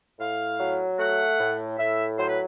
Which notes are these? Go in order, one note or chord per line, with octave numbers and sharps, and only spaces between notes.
A2 F5
F#3
A3 F#5
A2
A2 E5
F#3 C5
B4